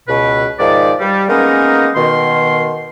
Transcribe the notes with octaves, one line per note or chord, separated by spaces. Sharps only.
C#2 B2 B4
G#2 D#3 F3 D5
G3
G#3 A#3 B3 C#4 D#4 A#4
B2 D#3 C6